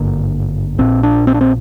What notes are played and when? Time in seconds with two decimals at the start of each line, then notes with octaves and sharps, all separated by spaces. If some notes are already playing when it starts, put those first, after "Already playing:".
Already playing: G#1 G2 D3 A#3
0.78 A#1 A#2 C4
1.03 D4
1.27 C4
1.34 D4
1.41 C4